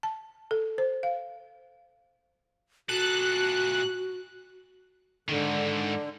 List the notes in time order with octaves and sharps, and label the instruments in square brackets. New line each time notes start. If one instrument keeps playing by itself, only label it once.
[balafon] A5
A4
C5
F5
[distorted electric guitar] A#2 A4 [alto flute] F#4 [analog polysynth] F#6
[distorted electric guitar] G#2 D#3 [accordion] D3